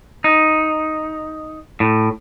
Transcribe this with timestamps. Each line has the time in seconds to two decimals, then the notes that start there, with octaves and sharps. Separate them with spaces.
0.24 D#4
1.80 A2